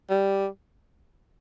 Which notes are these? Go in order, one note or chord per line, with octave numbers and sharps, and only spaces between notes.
G3